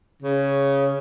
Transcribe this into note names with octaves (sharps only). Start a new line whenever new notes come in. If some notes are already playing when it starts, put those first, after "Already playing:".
C#3